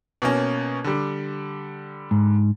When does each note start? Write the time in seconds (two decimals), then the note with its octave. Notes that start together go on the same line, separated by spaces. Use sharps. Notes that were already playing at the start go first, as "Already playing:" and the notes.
0.22 B2 A#3 C#4
0.84 D3 G3
2.11 G#2